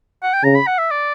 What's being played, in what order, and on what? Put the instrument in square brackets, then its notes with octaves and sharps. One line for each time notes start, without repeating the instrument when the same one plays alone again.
[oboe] F#5
G5
[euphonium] C#3 [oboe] A#5
[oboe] B5
F#5
E5
D5